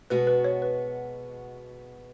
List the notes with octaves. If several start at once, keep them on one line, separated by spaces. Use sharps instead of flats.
B2 G#3 B3 F#4 B4
B4
C#5
B4